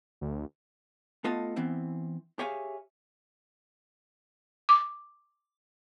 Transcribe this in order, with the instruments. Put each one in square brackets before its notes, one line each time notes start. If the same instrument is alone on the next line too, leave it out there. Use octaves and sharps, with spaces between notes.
[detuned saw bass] D2
[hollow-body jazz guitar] A3 B3 F4 A4 D#5 A5
E3 B3 C4 E4
G4 G#4 C#5 E5 F5 G#5
[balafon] D6